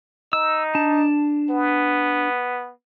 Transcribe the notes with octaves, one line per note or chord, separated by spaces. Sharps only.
D#4 E6
D4 A5
B3